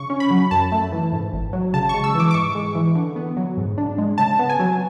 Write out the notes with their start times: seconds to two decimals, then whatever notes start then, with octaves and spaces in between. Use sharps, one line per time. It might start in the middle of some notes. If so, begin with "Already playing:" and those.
Already playing: C#3 C#6
0.10 C#4
0.20 B5
0.31 F#3
0.51 F#2 A5
0.72 A3
0.92 E3
1.13 G#2
1.33 G#1
1.53 F#3
1.74 C#3 A5
1.89 G#3 C#6
2.04 E6
2.15 E3 D6
2.31 D6
2.34 G#2 C#6
2.55 G#3
2.75 E3
2.95 D3
3.16 B3
3.37 F#3
3.58 G#2
3.78 D4
3.98 G#3
4.18 C#3 A5
4.39 B3
4.49 G#5
4.60 F#3